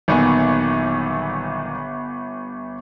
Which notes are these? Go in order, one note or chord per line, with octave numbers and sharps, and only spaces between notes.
G1 A#2 D#3 F#3 B3 G#5